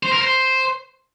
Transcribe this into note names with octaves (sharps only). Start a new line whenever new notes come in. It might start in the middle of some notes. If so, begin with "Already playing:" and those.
C5
A#4
C5